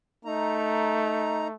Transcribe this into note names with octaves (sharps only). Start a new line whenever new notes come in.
A3 D#4 A#5